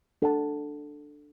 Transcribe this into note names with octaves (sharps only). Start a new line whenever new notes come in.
D4 A4 F#5 A5